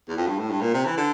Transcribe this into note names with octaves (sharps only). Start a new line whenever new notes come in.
E2
F2
G2
A2
G2
A#2
C3
E3
D3